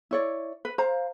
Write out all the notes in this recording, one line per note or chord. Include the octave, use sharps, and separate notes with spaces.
E4 C#5 D5
B4
C5 F5 A#5